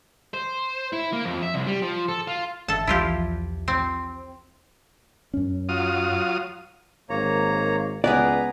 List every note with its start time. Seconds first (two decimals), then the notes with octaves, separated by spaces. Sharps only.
0.34 C5
0.92 E4
1.12 A#3
1.25 F2
1.42 E5
1.54 C2
1.67 G3
1.82 F3
2.08 A4
2.28 F4
2.68 G1 A4 E5 A5
2.87 B1 E2 F3 E4 F4 G4
3.68 C4
5.34 F#2 C#4
5.69 F#3 F4 D#6
7.10 G#1 A#3 C#5 A#5
8.04 C#2 B3 G#4 B4 D5 A#5